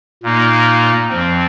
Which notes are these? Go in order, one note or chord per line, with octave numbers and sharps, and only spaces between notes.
A#2 A#3 D#4
F2 F3 C4